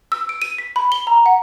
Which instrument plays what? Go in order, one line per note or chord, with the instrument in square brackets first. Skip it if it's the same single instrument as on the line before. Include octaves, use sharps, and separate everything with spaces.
[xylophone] E6
D7
D#7
B6
B5
G7
A#5
F#5